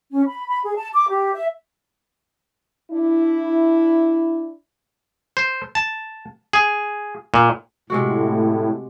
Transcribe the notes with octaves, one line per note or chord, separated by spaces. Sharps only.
C#4
B5
B5
G#4
A5
D6
G4
E5
D4 E4
C5
A5
G#4
A#2
A2 C3 G#3 F#4